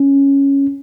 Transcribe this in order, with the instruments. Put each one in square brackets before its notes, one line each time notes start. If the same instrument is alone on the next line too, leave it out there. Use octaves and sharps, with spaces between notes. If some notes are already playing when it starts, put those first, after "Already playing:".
Already playing: [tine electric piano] C#4